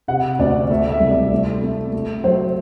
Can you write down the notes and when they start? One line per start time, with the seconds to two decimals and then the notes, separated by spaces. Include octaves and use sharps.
0.08 C3 F#5
0.39 D2 D5
0.70 A3 E5
0.90 E5
1.00 C2
1.10 D5
1.32 A3
1.62 A3
1.93 A3
2.24 F#3 C5